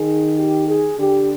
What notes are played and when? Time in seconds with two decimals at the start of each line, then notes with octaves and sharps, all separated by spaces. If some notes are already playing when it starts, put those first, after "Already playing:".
Already playing: D#3 G#4
0.37 G4
0.68 G#4
0.98 D3 G4